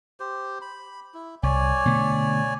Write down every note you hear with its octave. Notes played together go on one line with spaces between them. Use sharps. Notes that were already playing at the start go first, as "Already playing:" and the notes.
G4 C5
B5
E4
C2 C#5 D5 G#5
B2 D3 A3